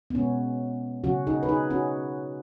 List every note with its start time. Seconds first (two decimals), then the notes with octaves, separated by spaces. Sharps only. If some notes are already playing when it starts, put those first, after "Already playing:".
0.10 B3
0.15 B2 G#3 C#4
1.04 C#3 F#3 C#4 F#4
1.27 D#4 G#4
1.43 B4
1.48 D#4 G#4
1.70 C#4 F#4